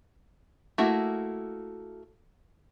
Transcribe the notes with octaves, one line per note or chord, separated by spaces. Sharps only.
A3 A#3 E4 F#4